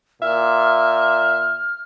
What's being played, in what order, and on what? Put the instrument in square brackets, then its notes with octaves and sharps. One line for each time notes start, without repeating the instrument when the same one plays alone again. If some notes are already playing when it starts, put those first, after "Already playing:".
[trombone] A#2 [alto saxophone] E5 [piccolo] F6